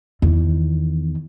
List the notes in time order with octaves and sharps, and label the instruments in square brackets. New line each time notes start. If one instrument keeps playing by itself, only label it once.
[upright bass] E2 D#3